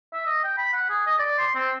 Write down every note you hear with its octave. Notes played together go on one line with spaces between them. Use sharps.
E5
D#5
G5
B5
F#5
G#4
D#5
D5
C6
C4